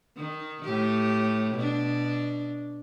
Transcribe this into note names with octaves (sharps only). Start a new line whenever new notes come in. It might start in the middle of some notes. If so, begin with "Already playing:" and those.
D#3
A2 G4
B2 D4